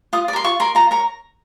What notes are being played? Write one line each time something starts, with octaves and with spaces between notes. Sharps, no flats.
F4 D#6
D5
A#4 C6
F4 C#6
A#4 D5 C6
F4 A#5
A#4 C#5 A#5